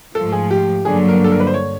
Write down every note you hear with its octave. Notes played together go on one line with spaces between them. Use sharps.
G#2 F3 A3 A4
G#4
G4
G2 D3 F#3 A#3 G#4
A#4
A4
A#4
B4
C5
C#5